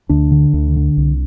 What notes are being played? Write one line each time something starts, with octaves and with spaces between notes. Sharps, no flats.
D2 D4
D3
D2
D3
C2